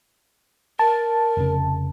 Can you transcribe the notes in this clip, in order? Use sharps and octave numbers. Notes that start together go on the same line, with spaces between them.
A#4 A5
F1 C#3